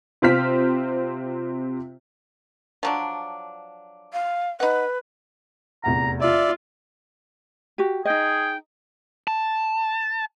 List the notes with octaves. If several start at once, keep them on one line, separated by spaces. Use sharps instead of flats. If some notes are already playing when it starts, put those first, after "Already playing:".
C3 C4 F4 C5 F6 B6
F3 F#3 D4
F5
D#4 B4 F#5
F1 E2 F#5 A#5
F4 D5 E5
F#4 G4
D#4 G#4 D#5 G5
A5